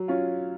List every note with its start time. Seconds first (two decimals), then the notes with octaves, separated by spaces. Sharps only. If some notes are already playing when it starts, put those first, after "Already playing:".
Already playing: F#3
0.08 C#4 F4